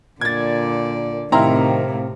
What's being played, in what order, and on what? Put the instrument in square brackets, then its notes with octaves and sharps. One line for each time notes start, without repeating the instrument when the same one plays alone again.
[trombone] A#2 [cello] D3 D5 [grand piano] G#6 A6
[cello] A2 C3 [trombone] D#3 [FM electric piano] C4 F5 [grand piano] E4 A#5